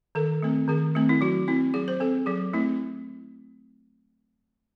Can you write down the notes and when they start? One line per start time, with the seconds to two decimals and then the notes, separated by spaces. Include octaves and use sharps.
0.15 D#3 A4
0.42 A3 C4
0.68 D#3 G#4
0.95 A3 C4
1.09 E4
1.21 F#3 F#4
1.48 C4 E4
1.74 F#3 G#4
1.88 C5
2.00 C4 A4
2.26 F#3 G#4
2.53 A3 C4 E4